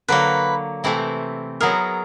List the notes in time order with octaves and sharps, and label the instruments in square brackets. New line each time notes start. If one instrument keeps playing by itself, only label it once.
[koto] D3 F#3 A#3 [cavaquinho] B4
[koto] C3 E3 A3 C4 E4
[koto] F#3 B3 E4 G#4 [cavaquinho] A#4